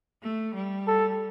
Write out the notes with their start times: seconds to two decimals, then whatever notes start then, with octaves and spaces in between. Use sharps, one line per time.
0.22 A3
0.55 G3
0.87 A4